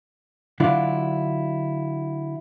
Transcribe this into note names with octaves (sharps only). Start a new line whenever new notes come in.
D3 F#3 D4 E4 F4